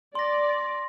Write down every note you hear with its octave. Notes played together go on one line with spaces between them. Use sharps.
D5 C6 A#6